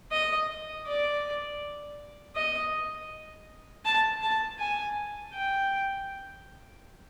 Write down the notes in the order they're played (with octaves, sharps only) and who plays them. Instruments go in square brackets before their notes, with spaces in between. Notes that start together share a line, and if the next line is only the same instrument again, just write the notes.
[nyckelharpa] D#5
D5
D#5
A5
A5
G#5
G5